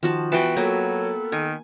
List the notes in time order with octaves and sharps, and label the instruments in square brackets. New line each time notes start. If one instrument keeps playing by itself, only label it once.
[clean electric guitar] D#3 [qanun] F3 F#4 A5
[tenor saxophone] E3 [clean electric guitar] B3 B4 G5 [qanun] F#4 A5
[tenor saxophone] F#3 [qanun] A#3 [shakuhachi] A4
[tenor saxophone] D#3 [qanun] G#5